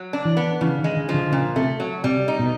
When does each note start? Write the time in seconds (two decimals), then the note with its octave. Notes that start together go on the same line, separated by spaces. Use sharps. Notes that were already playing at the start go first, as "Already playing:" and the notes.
Already playing: F#3
0.13 D4
0.25 E3
0.37 B3
0.61 C#3 E3
0.79 D#3
0.84 G#3
0.97 D3
1.09 F3
1.14 D3
1.32 A#2 C#3
1.56 C3 A3
1.80 F#3
2.04 C3 G3
2.28 D#4
2.39 B2